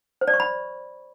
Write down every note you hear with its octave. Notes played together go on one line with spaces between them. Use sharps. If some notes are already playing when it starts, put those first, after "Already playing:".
C5
D5
C#6
B5